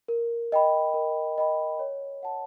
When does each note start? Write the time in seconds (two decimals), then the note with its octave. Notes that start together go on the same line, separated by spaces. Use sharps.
0.08 A#4
0.52 D#5 G5 B5
0.94 A#4
1.38 D#5 G5 B5
1.79 C#5
2.23 F#5 A5